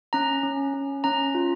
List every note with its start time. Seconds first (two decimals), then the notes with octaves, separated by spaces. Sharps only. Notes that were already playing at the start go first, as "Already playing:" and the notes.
0.13 C#4 A#5
0.43 C#4
0.74 C#4
1.04 C#4 A#5
1.35 F4